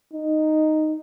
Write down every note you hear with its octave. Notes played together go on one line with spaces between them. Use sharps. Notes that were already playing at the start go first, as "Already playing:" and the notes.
D#4